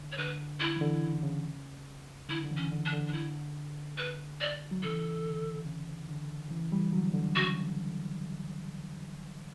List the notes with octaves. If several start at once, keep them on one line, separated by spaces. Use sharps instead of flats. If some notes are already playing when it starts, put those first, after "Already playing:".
Already playing: D3
C#5
D3 B4
D3 E4
E3
D3
C#3
C#3
D3 E4
D3
C#3 E3
C#4
D3
D4
D3
D4
E4
B4
D5
F#3
C#3 E3 A4
D3
C#3
D3
C#3 E3
E3 G3
D3 F#3
D3
C#3 F#4